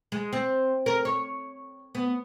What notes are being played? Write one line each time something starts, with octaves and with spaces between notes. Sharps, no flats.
G#3
C4
A#4
C#5
B3